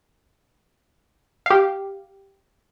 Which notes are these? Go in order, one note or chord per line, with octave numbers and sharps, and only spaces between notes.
G4 F5